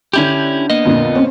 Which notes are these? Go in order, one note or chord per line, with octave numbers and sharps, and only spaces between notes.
D3 C#4 D4 E4 G4 G6
A#3 B3 D#5
F2 A#2 D3
C4 C#4 C5